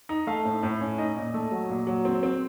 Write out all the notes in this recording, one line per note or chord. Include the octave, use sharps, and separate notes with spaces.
D#4
A3 F5
A2
A2
C#4
D#4 D#5
A#2
A3
F#3
A#2
F#3
C4
C4